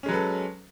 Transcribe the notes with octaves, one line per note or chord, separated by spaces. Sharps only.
F#3 G#3 C#4 A4 B4